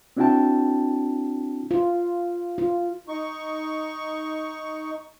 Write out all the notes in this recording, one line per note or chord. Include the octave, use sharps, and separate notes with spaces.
C4 D4 E4 F#4 G5 A5
F4
F4
D#4 C#6